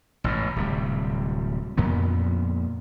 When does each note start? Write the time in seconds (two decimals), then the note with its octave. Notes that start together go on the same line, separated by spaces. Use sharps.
0.24 A1 G#2 B2
0.56 D1 C3 G3
1.78 F2 A#2 B3